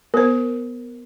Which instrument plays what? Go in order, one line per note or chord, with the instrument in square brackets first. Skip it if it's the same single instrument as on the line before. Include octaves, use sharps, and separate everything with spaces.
[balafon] B3 C5 [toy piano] A#4